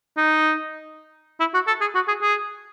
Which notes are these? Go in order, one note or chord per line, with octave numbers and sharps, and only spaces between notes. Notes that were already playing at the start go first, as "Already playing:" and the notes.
D#4
E4
F#4
A4
G#4
F#4
G#4
G#4